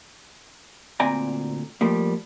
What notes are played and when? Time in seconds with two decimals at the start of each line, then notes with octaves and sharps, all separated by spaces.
1.00 D2 A#2 C4 D5 G#5 A#5
1.81 F3 G3 A3 A#3